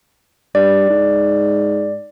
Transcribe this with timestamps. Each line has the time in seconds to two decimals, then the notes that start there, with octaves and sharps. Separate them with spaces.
0.55 G2 D5
0.90 G#2